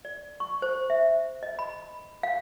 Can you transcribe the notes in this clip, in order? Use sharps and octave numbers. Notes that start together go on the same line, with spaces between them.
D5
C#6
C5
E5
D#5
B5
F5